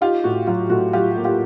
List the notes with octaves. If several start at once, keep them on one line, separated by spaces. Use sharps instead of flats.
D#4 F4 G4
A2 F#4
F#3 F4
A2 F#4
F#3 F4 G4
A#3
F4 G4